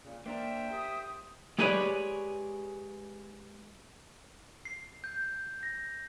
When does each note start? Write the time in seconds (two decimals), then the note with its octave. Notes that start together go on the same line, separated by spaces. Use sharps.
0.04 A#2 C#3
0.26 A#3 D4 A#4 C5 E5 G5
0.71 G4 D#6
1.58 G#3 G4 G#4 B4 C#5 D5
4.65 C7
5.04 G6
5.63 A#6